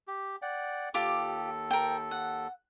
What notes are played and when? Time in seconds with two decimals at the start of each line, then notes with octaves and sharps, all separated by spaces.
0.07 G4
0.42 D5 F#5 G5
0.94 D#2 F4 G4 A4 D6
1.71 A#4 G5
2.11 F#5